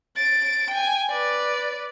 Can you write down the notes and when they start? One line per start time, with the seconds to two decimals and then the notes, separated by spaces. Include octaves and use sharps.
0.17 A6 D7
0.70 G5 G#5
1.10 B4 D5